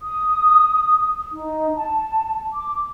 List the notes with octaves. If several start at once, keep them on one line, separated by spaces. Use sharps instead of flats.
D#6
D#4
A5
D6